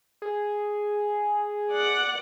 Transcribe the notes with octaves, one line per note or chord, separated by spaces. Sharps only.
G#4
D5 F#5